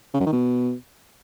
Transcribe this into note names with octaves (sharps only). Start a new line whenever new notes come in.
C#3
F#2
D#3
B2